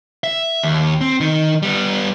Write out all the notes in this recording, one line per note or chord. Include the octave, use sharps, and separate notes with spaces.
E5
D#2
C4
D#3 D#4
G3 B3